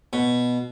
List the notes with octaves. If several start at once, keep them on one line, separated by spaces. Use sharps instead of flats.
B2